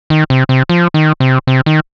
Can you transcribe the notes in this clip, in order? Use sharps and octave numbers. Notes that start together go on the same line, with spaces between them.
D#3
C3
C3
F3
D#3
C3
C3
D#3